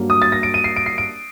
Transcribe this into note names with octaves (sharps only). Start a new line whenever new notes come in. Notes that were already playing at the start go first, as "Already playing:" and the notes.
Already playing: G2 F#3 A#3
D#6
A6
A#6
D7
D#7
C7
D7
C7
D7